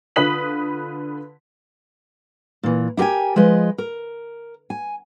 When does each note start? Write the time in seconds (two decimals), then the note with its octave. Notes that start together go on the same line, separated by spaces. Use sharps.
0.16 D3 F4 B4 D#6 B6 F#7
2.63 A#2 E3
2.97 E4 G4 A#4 G5 G#5
3.36 F3 G#3 B4 D#5
3.78 A#4
4.70 G#5